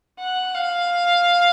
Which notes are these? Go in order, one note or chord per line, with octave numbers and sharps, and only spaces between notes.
F#5
F5